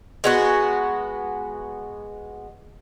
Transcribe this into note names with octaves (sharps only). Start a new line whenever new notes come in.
G#3 B3 F#4